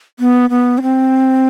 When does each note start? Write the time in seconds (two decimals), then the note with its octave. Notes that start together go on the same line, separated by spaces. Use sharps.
0.20 B3
0.50 B3
0.78 C#4
0.82 C4